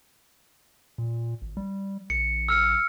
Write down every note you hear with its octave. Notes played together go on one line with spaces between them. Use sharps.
A#2
G#1
G3
A#1 C#7
E6 F6 C#7